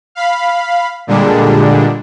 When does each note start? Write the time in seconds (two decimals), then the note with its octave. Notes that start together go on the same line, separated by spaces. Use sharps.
0.15 F5 B5
1.07 A#2 D3 G3 G#3 D4